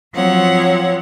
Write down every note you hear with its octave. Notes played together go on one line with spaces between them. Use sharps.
F3 F#3 C4 C#5 F#5